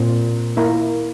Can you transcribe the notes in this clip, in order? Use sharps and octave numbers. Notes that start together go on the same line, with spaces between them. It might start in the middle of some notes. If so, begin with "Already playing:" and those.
Already playing: A#2 C4
A#3 E4 A#4